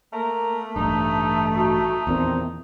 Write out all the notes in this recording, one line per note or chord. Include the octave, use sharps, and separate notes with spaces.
A3 A#3 A#4
A1 G2 D#4
D#4 F#4
E2 A#2 D#3 C4